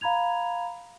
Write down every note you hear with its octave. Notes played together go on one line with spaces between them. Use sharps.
F5 A#5 B5 G#6 F7